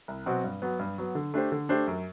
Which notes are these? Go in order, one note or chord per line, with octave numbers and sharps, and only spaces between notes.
C2
B2 F#3 C4 F#4
G2
F#3 B3
G2
F#3 B3
D3
A3 D4 G4 C5
D3
A3 D4 G4 C5
F#2